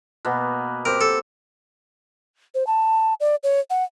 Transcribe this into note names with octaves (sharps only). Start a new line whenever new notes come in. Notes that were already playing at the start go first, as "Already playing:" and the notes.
B2 A#3 B3
C4 G4 A#4
A4
C5
A5
D5
C#5
F#5